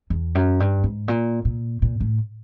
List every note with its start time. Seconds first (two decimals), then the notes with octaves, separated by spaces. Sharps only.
0.10 E2
0.35 F#2
0.60 G2
0.84 G#2
1.08 A#2
1.45 A#2
1.82 A#2
2.00 A2